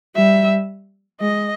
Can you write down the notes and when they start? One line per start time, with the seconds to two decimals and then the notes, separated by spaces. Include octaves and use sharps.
0.16 G3 E5
1.20 G#3 D#5